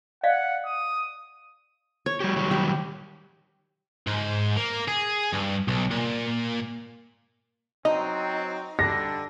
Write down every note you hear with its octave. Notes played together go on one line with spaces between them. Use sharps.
D5 D#5 F5 F#5
D#6
C#5
G3 F#4 G4
D#3 F#3 G3
G4
G#2
A#3
G#4
G2
B1
A#2
F#3 C4 D#4 D#5
D3 G3 D4 A#6